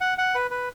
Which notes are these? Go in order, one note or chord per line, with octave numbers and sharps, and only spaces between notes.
F#5
F#5
B4
B4